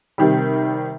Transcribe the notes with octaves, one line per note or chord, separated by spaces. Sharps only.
C3 D#3 G3